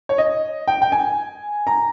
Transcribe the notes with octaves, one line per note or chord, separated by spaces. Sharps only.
C#5
D#5
G5
G5
G#5
A#5